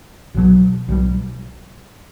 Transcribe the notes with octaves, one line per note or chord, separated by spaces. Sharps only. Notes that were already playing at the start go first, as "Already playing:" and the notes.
B1 B2 F#3
B1 B2 G3